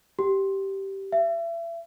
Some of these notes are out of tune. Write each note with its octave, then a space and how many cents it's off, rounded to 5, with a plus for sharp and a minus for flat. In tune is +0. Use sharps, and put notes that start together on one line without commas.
G4 -10
E5 +35